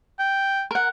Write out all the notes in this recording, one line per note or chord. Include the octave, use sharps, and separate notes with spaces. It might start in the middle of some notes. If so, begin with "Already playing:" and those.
G5
A#4 F#5